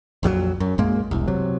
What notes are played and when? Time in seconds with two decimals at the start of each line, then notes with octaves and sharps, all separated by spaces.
0.23 A#1 F2 E3 F#3
0.60 F#2
0.78 A#1 F#2 G#3 A#3
1.11 E1 C2
1.28 C3 F#3